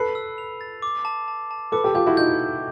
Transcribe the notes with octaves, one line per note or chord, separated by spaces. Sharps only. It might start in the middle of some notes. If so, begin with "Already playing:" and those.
Already playing: A4 B4 C7
E6
F7
A6
D6
A5
A5
A5
A4 B4 D6
G4 A4
F4 G4 G6
E4 F#4
D#4 F4 G6
G6